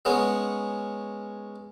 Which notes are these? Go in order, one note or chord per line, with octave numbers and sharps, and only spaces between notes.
G#3 B3 C#4